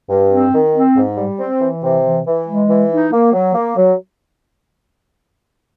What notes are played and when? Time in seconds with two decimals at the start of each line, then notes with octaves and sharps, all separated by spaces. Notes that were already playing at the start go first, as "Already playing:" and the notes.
0.09 G2
0.31 C4
0.53 D#3
0.74 C4
0.96 G#2
1.17 G3
1.39 C4
1.61 E3
1.83 C3
2.03 E3
2.26 E3
2.47 G#3
2.69 E3
2.90 D#4
3.11 A#3
3.33 F#3
3.55 A#3
3.77 F#3